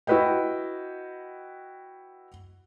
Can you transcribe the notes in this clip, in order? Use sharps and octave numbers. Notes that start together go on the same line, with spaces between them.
E4 F#4 B4 D#5 G5